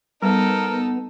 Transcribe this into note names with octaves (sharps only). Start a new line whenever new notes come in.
G3 B3 D#4 A4 A#4